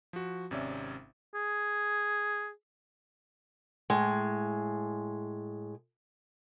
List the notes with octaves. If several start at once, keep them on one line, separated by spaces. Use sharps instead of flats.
F3 F#4
G#1 C3 C#4 D5 E5
G#4
A2 G#3